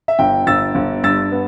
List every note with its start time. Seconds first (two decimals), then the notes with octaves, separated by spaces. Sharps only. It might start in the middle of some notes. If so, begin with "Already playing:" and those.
0.08 E5
0.19 G1 G5
0.47 G1 E6 A6
0.75 G1
1.04 G2 E6 A6
1.32 B3